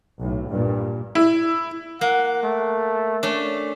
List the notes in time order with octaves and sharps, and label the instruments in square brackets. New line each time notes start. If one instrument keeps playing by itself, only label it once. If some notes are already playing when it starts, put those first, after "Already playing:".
[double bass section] B1 A2
G2 A#2
[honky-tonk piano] E4
[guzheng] A#3 [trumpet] F#5
[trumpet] A3
[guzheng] A3 C#4 D4